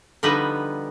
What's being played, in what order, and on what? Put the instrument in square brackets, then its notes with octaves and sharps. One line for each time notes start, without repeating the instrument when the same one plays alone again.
[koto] D3 F3 G3 B3 D#4 B4